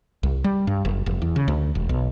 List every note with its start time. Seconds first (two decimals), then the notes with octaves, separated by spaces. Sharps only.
0.23 C2
0.44 G3
0.67 G2
0.85 F#1
1.06 F1
1.22 E2
1.36 C#3
1.48 D2
1.75 E1
1.89 B1